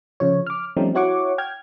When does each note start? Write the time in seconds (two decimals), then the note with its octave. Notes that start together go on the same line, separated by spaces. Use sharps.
0.20 C#3 F3 C#5
0.47 D6 F6
0.77 F3 G3 A3 C4 C#4 D#4
0.95 E4 F#4 C#5 F#5 C#6 D6
1.38 G5 F6 G#6